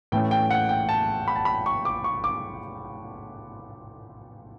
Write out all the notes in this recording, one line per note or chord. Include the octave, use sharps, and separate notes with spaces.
A2 E3 A3 C#4 G5
G5
F#5
G5
A5
B5
A5
B5
C#6
D6
C#6
D6